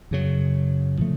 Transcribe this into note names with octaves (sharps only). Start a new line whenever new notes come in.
F#2 C#3 F#3
C#3 F3 A3